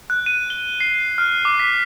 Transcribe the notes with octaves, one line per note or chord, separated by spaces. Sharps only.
F#6
D#7
G7
C7
F6
D6
B6